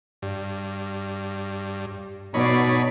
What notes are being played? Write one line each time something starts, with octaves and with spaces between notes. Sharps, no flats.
G2
B2 D#4 C#5 D5 B5